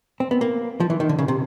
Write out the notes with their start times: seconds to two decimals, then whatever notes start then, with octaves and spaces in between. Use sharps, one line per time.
0.20 C4
0.31 B3
0.41 A#3
0.80 F3
0.90 E3
1.00 D#3
1.09 D3
1.18 C#3
1.28 C3